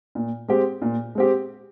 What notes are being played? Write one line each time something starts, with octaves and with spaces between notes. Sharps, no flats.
A#2
G#3 C4 G4
A#2
G#3 C4 G4